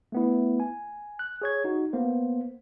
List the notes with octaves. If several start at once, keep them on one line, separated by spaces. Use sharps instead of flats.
A3 B3 E4
G#5
F#6
G#4 C#5 G#6
D#4 F#4
A#3 B3 C5